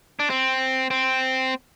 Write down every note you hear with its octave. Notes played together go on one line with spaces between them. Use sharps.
D4
C4
C4